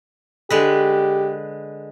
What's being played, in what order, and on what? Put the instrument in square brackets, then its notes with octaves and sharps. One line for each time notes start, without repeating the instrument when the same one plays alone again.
[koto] D3 G#3 B4 [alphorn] G4